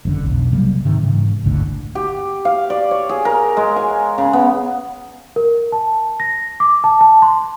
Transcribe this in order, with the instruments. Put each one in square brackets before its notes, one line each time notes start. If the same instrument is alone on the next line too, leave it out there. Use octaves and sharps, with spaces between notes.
[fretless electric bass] F#1 F2 D3
B1 F2
C3 F#3 G3 A#3
G#2 C3 D#3
G#2 C#3 E3 G#3
G1 C#2 A2 D3
[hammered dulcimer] G4
F5
D5
C#5
G#4
A#4
G#3
G#5
C#3
B3
[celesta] A#4
A5
A#6
D6
A5
A5
C6